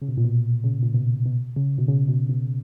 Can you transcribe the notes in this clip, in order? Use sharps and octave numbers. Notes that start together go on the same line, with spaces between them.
C#3
B2
A#2
B2
C#3
A#2
B2
B2
C#3
B2
C#3
B2
B2